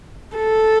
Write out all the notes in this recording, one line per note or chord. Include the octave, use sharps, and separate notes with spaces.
A4